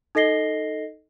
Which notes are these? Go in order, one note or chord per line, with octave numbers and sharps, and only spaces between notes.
D#4 A4 D#5 A#6 C7 G7